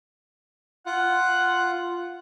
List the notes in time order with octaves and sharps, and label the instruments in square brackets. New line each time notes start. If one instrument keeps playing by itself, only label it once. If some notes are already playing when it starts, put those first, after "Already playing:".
[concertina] F4 [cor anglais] F#5